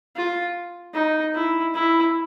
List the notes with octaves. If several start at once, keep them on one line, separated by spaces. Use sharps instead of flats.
F4
D#4
E4
E4